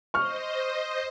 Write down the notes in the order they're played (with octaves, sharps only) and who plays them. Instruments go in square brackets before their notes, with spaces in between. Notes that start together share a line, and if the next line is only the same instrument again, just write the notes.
[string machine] C5 D#5 [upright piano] C#6 F6